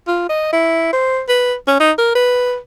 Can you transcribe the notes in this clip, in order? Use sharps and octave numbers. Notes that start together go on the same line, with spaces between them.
F4
D#5
E4
C5
B4
C#4
D#4
A#4
B4